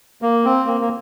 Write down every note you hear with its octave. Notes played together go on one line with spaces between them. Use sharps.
A#3
C4
A#3
A#3